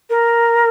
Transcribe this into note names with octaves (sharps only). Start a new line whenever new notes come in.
A#4